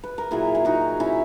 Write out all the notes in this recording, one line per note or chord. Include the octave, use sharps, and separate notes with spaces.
B4
A#4
A#2 F#3 E4 G#4
G#4
D#4 F#4
C#4 E4